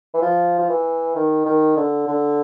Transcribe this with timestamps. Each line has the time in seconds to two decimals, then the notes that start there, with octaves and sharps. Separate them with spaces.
0.14 E3
0.22 F3
0.59 F3
0.69 E3
1.16 D#3
1.45 D#3
1.77 D3
2.08 D3